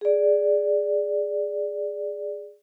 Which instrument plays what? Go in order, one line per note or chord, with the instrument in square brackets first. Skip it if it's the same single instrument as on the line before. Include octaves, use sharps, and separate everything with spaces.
[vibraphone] G#4 D5